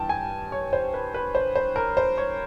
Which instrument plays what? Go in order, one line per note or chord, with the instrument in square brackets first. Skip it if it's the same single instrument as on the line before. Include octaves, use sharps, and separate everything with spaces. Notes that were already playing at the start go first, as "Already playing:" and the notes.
Already playing: [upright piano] G2 E3 G5 A5
G#5
C#5
C5
B4
B4
C5
C5
A#4
C5
C#5